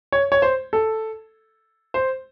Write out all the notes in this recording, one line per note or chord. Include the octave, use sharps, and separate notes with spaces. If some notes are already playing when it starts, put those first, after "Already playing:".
C#5
C#5
C5
A4
C5